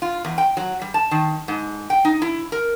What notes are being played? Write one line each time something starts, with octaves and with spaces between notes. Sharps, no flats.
F4
E2
G5
F#3
G3
A5
D#3
G#2
G5
D#4
E4
A#4